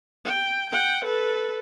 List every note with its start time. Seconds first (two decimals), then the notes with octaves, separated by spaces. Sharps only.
0.25 G5
0.70 F#5 G5
1.05 A4 B4